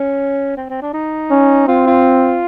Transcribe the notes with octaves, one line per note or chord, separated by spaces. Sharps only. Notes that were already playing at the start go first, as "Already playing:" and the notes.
Already playing: C#4
C4
C4
D4
D#4
C#4
C4 F4
F4